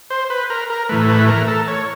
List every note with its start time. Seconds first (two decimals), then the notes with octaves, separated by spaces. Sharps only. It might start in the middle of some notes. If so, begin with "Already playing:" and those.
0.10 C5
0.30 B4
0.50 A#4
0.70 A#4
0.89 A2 E3 A3 B4
1.09 B4
1.29 A#4
1.48 A4
1.68 C#5